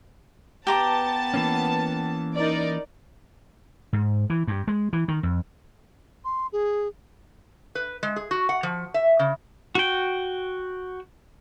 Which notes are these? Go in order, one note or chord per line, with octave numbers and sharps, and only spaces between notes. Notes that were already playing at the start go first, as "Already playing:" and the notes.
B3 G4 A5 A#5 D6
E3 A#3 C#4
D#4 A#4 D5
G#2
E3
G2
G#3
E3
D#3
F2
C6
G#4
B4
G#3
G#4
F#4
F#5
F3
E5
C#3
F#4 G5